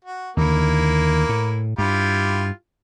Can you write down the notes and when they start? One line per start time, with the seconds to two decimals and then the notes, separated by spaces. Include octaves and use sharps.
0.05 F#4
0.37 D#2 D3 A#3 E4
1.29 A2
1.78 G2 E4 F4 G4